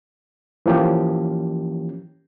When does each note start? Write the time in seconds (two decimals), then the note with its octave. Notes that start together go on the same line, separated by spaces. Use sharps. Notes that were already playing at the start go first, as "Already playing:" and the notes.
0.66 E3 F3 A#3 C#4 G4